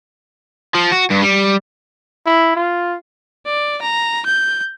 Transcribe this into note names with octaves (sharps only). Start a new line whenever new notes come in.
F3
F#4
G2
G3
E4
F4
D5
A#5
G6